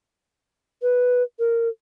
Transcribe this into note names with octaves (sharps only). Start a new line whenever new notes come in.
B4
A#4